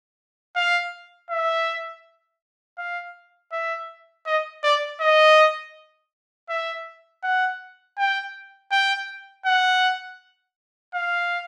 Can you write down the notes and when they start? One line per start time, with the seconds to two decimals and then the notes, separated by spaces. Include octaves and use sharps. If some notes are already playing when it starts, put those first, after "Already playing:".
0.56 F5
1.30 E5
2.78 F5
3.52 E5
4.26 D#5
4.63 D5
5.01 D#5
6.49 E5
7.23 F#5
7.98 G5
8.72 G5
9.46 F#5
10.94 F5